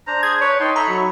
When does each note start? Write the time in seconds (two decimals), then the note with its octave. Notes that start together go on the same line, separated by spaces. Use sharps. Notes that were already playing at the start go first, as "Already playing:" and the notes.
0.07 D4 C5 A#5
0.23 G#4 G#6
0.41 B4 C#5
0.60 D#4 G5 A5 C6
0.76 A4 C#5 E5 A#5 B5
0.88 F#3